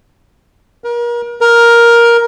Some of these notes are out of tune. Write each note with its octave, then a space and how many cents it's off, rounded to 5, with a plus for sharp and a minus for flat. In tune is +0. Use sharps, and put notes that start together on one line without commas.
A#4 +35
A#4 +10